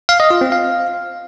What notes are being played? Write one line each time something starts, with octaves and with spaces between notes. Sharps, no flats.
F5
D#5
F4
C4
F5